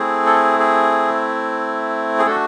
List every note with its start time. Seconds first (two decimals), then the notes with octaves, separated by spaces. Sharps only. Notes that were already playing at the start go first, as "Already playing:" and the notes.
Already playing: A3 C4 E4 G#4
0.26 A4
0.59 G#4
2.19 G#4
2.26 A3 D4 F#4 A4